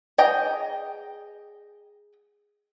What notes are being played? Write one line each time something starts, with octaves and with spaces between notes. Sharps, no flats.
G#4 D#5 G5 A#5